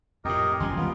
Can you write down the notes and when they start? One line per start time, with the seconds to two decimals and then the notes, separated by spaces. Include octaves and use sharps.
0.25 F2 A2 G4 A#4 D#5
0.60 G1 F#2 F3 G#5 C6
0.77 D#2 F#3 G3 B3 F4